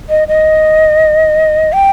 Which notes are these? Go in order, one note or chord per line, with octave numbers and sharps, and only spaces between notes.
D#5
D#5
G5